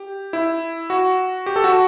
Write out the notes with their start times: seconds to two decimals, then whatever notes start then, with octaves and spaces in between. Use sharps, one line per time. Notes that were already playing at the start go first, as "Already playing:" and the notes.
Already playing: G4
0.33 E4
0.90 F#4
1.46 G4
1.56 A4
1.64 F#4